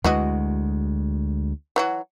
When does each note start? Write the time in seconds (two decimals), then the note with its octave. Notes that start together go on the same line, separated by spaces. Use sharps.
0.04 D2 E3 G#3 F#4 D#5
1.76 E3 F#3 F#4